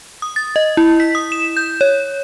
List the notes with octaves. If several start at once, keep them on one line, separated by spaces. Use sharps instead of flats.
D#6
A6
D#5
E4
B6
D#6
E7
G6
C#5